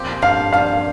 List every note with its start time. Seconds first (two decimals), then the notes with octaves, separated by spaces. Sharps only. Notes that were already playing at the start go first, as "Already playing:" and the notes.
Already playing: A#2 F3 C4 G4
0.22 G2 F5
0.53 G3 F5